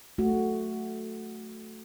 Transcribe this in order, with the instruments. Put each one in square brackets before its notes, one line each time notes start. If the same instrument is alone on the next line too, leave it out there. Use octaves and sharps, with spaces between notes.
[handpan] A3 F#4